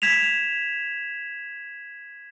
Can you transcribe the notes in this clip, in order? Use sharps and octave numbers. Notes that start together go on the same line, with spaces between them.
G#6 B6 E7 F7